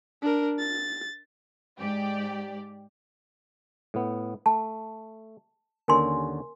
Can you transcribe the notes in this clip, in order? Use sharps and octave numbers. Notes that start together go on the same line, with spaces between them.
D4 A#4
A6
G#2 G4 D5
A2 B3
A3 A5
D#2 D3 C#4 A#4 G#5 C6